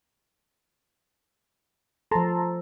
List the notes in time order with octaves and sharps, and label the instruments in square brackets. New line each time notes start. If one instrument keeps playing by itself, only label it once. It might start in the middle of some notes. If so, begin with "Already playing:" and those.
[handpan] F3 A4 [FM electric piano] A5 A#5 C6